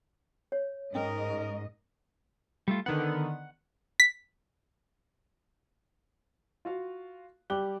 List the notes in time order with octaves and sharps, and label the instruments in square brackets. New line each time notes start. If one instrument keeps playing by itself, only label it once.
[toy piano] C#5
[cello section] G#2 D#5 [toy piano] C#4 [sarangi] A#4
[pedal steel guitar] G3 A3 F4
[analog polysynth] D3 D#3 B3 [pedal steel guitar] F#5 F#6
[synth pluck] B6
[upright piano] F4 F#4 F5
[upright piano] G3 F#6 G7 [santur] G4